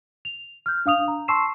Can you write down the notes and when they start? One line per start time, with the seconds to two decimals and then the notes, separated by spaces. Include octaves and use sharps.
0.25 F7
0.66 F6 G6
0.86 D4 F5 D#6 F7
1.08 A#5
1.28 A5 C6 C#6 E6 C7 E7